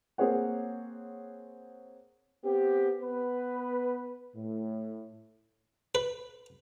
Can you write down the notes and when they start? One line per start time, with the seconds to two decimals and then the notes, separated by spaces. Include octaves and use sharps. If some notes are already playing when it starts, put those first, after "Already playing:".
0.18 A#3 C4 G#4 C#5 F#5
2.44 B3 C4 G4
3.01 B3 B4
4.35 A2
5.95 B4